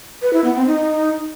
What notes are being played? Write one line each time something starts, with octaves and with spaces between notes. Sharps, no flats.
B4
E4
B3
C4
D#4